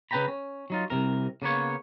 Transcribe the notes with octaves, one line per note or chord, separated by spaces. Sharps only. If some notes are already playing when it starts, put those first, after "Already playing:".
C#3 B4 C5 G5 A#5 B5
C#4
F#3 D#4 F4
C2 F2 C3 A#4
C#3 A#3 B3 C#5